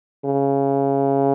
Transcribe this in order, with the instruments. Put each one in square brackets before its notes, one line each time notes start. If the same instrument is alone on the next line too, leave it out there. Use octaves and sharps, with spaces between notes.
[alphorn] C#3